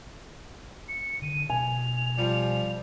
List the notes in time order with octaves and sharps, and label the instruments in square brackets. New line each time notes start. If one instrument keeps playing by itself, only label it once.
[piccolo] C#7
[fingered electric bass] D3 [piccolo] D#7
[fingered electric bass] B2 [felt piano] G#5 [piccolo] F7
[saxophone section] F3 G3